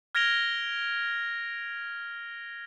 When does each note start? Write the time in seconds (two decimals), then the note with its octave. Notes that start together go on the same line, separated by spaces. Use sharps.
0.15 F6 G#6 A#6 D7 F7 G7